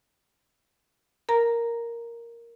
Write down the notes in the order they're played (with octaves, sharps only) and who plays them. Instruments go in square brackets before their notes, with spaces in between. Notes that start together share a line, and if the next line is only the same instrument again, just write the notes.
[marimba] A#4 A#5